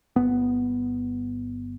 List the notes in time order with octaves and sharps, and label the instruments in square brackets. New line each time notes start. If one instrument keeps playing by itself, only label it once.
[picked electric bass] G1 B3